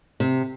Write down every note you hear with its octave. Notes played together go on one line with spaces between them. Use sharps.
C3